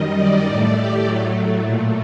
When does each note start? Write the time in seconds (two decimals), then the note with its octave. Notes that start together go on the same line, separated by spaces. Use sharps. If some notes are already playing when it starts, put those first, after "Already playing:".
Already playing: F#2 D#3 G3 D#5
0.18 D5
0.47 A2 A3 D5
0.76 G4
1.05 A2 F#3 A3
1.64 A#2 A3